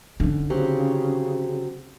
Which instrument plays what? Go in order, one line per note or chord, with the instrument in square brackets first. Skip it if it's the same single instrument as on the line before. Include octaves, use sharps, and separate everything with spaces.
[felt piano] D3 [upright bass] C#4 D#4
[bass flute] C#3 [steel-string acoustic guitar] F#3 C4 G4